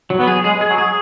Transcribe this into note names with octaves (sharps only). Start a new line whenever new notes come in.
F#3
B3
G#4
G#3 G#4
G#4
F#3
G#4